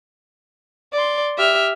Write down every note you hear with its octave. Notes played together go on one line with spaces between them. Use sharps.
D5 C6
G4 E5 F6